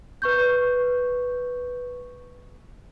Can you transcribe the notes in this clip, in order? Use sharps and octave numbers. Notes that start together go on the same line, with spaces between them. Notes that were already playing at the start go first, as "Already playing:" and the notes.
B4 C#6 G6